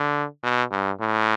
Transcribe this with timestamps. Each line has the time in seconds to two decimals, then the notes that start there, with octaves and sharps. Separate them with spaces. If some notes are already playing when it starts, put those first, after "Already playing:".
Already playing: D3
0.43 B2
0.71 G2
1.00 A2